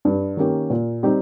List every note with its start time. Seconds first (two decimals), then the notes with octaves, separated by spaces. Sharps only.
0.05 G2
0.37 D#3 A#3 C#4 G4
0.70 A#2
1.03 G3 C4 D#4 G4